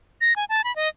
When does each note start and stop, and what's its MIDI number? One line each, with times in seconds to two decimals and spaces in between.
0.21 0.36 94
0.36 0.45 80
0.49 0.62 81
0.64 0.74 83
0.76 0.88 75